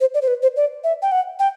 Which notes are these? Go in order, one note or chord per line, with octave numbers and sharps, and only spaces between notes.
C5
D5
C5
B4
C5
D5
E5
G5
F#5
G5